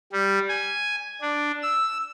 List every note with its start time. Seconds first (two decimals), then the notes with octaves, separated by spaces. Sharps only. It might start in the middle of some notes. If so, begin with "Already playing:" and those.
0.12 G3
0.49 G#5
1.22 D4
1.63 E6